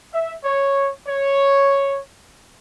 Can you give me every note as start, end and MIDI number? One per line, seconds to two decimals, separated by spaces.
0.14 0.34 76
0.44 0.90 73
1.07 1.99 73